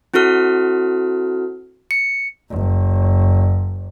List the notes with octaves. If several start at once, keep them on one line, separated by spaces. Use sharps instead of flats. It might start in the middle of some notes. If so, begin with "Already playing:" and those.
C4 E4 F#4 A4 F6
C#7
F#1